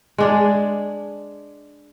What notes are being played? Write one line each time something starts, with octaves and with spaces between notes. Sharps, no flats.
G#3 D4 G#4